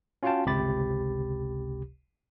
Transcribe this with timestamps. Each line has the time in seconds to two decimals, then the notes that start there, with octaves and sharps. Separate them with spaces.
0.23 C#4 F4 F#4 F5 G5 A5
0.46 G1 C#2 C3 G4 B5 A6